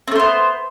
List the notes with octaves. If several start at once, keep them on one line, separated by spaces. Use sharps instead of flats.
A3 B3 C4 C5